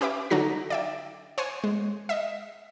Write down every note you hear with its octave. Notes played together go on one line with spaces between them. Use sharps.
C#4 G4 B4 E5 D6
D3 F#3 D#4 F#4 A#6
D5 E5 G5
C5 C#5 F#5 G#5
G#3
D#5 E5